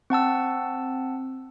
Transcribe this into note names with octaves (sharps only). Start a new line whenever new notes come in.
C4 F#5 A5 E6